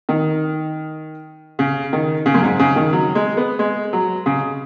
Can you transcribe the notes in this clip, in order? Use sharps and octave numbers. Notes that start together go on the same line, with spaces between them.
D#3
C#3
D#3
C#3
F#2
G#2
C#3
D#3
F#3
G#3
B3
G#3
F#3
C#3